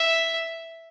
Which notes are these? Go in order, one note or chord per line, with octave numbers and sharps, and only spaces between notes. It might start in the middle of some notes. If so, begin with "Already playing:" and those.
Already playing: E5